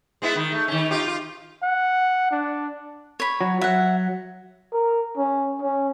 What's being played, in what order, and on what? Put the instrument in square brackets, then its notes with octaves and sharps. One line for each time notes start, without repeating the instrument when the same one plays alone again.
[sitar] G#3 B3 E4
D#3
A3
D#3 C#4
D#4 F4 G4
F4
[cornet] F#5
D4
[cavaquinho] C#5 B5
[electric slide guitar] F#3
[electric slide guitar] F#3 [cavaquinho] E5 F#5
[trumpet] A#4
C#4
C#4